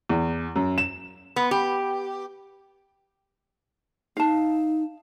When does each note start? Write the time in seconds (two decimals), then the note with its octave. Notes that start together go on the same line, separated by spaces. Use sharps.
0.09 E2
0.56 F#2
0.78 E7
1.36 B3
1.51 G4
4.17 D#4 F5 A5